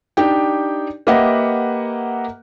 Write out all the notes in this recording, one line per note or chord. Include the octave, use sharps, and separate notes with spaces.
D4 D#4 G4 G5
A#3 G4 B4 D#5 E5 F#5